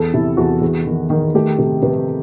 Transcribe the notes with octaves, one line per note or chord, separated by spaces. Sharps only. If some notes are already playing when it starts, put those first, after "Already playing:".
Already playing: E2 A4
C3 E4
E2 F#4
E2
D#3
D#3
A3 G4
C3 A4
C3 B4